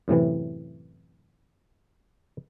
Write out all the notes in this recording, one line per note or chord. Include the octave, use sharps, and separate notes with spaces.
F#2 A2 C3 E3